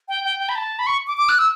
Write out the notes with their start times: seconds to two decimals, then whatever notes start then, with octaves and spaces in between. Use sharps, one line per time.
0.09 G5
0.24 G5
0.40 G5
0.49 B5
0.55 A5
0.79 B5
0.87 C#6
1.07 D6
1.17 D6
1.29 F#6
1.39 E6